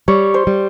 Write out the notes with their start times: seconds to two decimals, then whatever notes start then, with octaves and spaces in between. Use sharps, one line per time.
0.08 G3 C#5
0.34 C5
0.47 G3